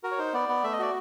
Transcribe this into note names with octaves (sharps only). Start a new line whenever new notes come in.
F#4 A#4
C#5
D#4 C5
B3 D5
B3
A3 E5
D#5
F#4 D5